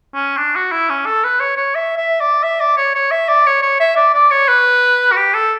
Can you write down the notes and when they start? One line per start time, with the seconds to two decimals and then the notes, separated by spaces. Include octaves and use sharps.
0.14 C#4
0.37 D4
0.56 F#4
0.72 E4
0.90 C#4
1.06 A4
1.24 B4
1.41 C#5
1.57 C#5
1.75 E5
1.97 E5
2.21 D5
2.43 E5
2.60 D5
2.77 C#5
2.95 C#5
3.11 E5
3.29 D5
3.46 C#5
3.63 C#5
3.80 E5
3.97 D5
4.14 D5
4.31 C#5
4.49 B4
5.12 F#4
5.16 G4
5.34 A4